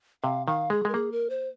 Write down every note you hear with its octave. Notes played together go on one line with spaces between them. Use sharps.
C3 F5
D#3 F5
G#3 G#4
G#3 A#4
A#3 G#4
A#4
C5